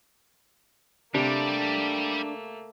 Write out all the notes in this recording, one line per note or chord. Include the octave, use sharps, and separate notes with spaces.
C3 G3 A3 A#3 D4